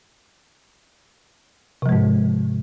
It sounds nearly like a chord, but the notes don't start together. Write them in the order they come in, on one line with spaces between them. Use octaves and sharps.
C3 F3 G#3 G#2